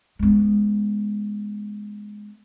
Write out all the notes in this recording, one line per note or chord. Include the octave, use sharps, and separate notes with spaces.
G#3 B3